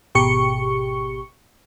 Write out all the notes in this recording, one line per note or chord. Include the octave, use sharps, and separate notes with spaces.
G#1 B2 G4 C#6 C#7